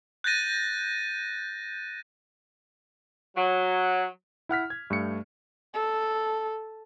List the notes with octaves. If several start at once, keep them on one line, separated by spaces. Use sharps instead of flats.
F#6 G6 A6 A#6 D#7
F#3
E4 F#5 F6 B6
G#6
G2 A3 C#7
A4